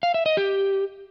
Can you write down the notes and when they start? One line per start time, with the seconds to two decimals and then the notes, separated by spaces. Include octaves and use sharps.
0.03 F5
0.14 E5
0.26 D#5
0.37 G4